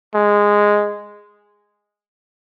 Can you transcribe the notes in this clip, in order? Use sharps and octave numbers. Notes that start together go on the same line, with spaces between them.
G#3